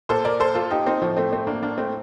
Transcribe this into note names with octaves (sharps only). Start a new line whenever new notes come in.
A#2 A4 C5
A#4 D5
A4 C5
F4 A4
D#4 G4
C4 D#4
A2 F3
A3 C4
A3 C4
A#3 D4
A#3 D4
A3 C4